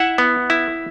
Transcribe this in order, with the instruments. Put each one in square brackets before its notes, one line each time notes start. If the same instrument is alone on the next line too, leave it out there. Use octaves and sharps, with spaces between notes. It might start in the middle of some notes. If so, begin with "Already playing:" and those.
Already playing: [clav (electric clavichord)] E4 E5 F#5
B3
E4